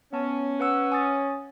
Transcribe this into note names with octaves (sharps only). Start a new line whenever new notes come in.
B3 C#4 A5
B4 F#5 E6
G#5 D#6 A6